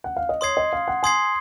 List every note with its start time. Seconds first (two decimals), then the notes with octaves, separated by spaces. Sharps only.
0.04 F#5
0.17 F5
0.29 D#5
0.41 C#5 C6 D#6 G#6 C7
0.57 D#5
0.73 F5
0.88 F#5
1.03 G#5 C6 D#6 G#6 C7